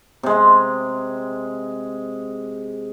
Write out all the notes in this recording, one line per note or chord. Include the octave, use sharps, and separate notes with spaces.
C3 G#3